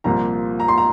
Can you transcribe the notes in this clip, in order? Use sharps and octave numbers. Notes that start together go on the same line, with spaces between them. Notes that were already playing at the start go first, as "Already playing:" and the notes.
C2 A#2 F3 A#3 A#5
A#5
C6
A#5